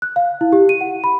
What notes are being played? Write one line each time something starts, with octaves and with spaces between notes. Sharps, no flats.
F#6
F5
E4
G4
D#7
F#5
B5